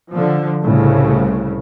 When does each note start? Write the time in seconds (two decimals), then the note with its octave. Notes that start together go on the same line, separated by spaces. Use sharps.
0.11 D3 F3
0.63 C2 A2 C#3